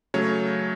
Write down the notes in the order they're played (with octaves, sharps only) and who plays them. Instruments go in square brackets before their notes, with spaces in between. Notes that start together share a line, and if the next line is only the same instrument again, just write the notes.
[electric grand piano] C#3 F#3 A3 C#5